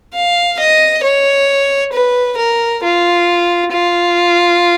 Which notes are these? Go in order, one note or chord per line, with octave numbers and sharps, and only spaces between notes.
F5
D#5
C#5
B4
A#4
F4
F4